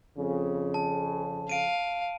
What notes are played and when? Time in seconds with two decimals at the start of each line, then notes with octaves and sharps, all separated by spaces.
0.17 F2 C#3
0.74 A5
1.49 F5 D7 D#7